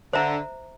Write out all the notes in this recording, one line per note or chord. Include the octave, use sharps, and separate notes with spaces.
D3 C5 E5 A#5